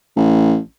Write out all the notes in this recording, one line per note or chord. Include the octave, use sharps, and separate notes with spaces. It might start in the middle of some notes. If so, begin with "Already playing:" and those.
A1